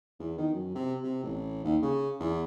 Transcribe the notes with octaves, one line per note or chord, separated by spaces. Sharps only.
E2
D#3
F#2
C3
C3
A1
D#2
C#3
E2